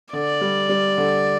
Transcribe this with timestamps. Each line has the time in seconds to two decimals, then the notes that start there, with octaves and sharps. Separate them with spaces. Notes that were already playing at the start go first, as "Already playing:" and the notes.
0.13 D3 D5
0.41 G3
0.69 G3
0.98 D3